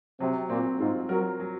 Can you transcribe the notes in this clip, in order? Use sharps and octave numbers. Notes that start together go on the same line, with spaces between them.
C3 F#3
A#2 C4
G#2 F4
F#3 A#4
F#3